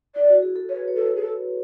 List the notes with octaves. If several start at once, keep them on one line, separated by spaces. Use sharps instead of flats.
E4 D5
F#4
G#4
A4
B4 C#5
C#5
A4
G#4
A4